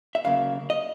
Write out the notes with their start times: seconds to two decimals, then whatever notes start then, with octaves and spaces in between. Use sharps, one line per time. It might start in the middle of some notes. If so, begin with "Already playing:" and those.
0.15 E5
0.24 D2 C#3 F#3 A#3 F5
0.70 D#5